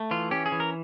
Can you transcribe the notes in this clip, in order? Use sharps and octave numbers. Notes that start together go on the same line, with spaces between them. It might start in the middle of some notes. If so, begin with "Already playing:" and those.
Already playing: A3
E3 F4
C#4 G4
G#4
E3
A#4